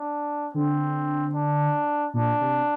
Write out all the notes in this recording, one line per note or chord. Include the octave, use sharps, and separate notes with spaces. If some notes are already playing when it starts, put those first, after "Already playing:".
Already playing: D4
D3 C4
D4
A#2 D4
C3